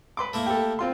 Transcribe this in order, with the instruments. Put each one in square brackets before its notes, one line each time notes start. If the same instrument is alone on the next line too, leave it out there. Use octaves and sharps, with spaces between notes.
[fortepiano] B4 C6 D6
[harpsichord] A3 A#3 E4
[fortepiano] G4 A4
C4 F4 C6